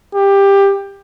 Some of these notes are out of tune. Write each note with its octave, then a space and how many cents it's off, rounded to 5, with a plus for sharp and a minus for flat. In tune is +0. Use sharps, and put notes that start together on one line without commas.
G4 +15